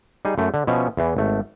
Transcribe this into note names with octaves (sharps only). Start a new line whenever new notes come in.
G3 D#4 G#4
F#2 A3
D3
B2 F3 C#4 E5
E2 E3
G#1 A3